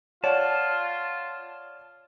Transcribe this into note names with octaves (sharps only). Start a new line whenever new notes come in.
F4 C#5 D5 F#5 A5